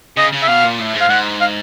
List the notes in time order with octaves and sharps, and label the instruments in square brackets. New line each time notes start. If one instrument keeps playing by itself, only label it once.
[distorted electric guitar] C#3 [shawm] D#5
[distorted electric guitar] C#3
[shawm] E5
[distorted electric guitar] B2 [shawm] F5
[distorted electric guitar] A#2
A2
G#2
[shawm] F5
[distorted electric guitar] G#2 [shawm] F#5
[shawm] F5